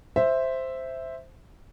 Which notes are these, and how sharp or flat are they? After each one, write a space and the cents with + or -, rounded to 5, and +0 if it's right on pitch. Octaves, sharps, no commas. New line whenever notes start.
C5 +0 E5 +0